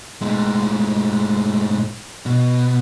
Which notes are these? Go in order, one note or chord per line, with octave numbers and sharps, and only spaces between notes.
A2 G#3
B2